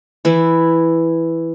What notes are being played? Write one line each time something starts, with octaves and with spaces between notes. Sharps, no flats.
E3 E4